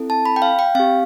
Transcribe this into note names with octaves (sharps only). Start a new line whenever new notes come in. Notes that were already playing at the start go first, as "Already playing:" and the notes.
Already playing: C4 E4 A4
A5
B5
G5
F5
G5
C4 G4 F5